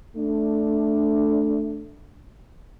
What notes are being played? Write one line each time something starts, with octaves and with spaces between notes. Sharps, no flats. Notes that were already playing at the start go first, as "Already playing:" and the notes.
A3 D4